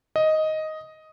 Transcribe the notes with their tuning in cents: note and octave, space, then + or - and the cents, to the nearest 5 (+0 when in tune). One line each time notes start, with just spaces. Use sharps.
D#5 +5